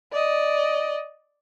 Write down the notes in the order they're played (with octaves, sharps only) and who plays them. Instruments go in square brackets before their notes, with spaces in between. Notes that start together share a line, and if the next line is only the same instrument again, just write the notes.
[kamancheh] D5 D#5